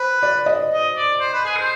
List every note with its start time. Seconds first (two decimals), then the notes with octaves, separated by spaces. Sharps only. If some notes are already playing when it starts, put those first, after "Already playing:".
Already playing: B4 C5
0.23 D5
0.46 D#5
0.71 D#5
0.96 D5
1.20 C5
1.33 B4
1.45 G#4
1.56 C5